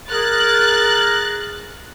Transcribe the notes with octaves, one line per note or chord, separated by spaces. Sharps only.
G#4 A#4 F#6 A6